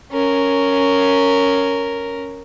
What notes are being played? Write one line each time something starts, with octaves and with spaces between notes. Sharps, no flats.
C#4 A#4